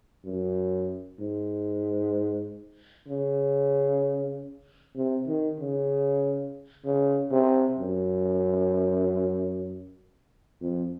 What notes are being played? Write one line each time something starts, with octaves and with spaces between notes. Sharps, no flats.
F#2
G#2
C#3
C3
D#3
C#3
C#3
C3
F#2
F2